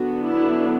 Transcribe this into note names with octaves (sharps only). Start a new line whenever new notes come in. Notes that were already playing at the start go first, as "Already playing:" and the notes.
Already playing: D3 F#3 B3 D4 F#4
E4